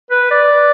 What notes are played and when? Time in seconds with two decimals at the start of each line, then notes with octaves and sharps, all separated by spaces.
0.11 B4
0.31 D5